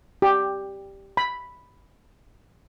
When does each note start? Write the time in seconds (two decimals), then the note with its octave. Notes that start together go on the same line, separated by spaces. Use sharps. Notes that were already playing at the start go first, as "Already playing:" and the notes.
0.22 G4
1.17 B5